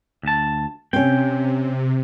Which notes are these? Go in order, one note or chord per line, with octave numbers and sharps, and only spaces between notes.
D2 A5
C3 C4 C#4 G5